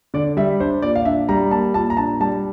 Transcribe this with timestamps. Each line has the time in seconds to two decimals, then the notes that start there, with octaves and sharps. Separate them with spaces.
0.14 D3 D5
0.37 G3 E5
0.60 D4 C5
0.82 A#2 D5
0.96 F5
1.05 D4 E5
1.29 G3 A#5
1.51 A#3 A5
1.74 A#2 A5
1.90 A#5
1.97 D4 A5
2.20 G3 A5